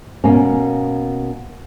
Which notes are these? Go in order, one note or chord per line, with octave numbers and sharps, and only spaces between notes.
B2 A#3 C#4